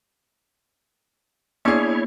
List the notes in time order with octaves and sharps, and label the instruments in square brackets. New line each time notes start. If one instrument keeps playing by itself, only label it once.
[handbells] A#3 B3 [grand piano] D4 G#4 [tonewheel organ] E4 C#5